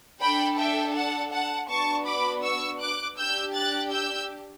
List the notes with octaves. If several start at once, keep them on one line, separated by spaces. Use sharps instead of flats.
D4 A4 G5 B5
E5 G5
F#5 A5
F#5 A5
B3 D4 F#4 A5 C#6
B5 D6
C#6 E6
D6 F#6
D4 G4 E6 G6
F#6 A6
E6 G6